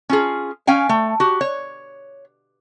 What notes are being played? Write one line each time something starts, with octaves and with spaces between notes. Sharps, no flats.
C#4 F4 G#4
C#4 F5 G5 G#5
A3
F#4 G4
C#5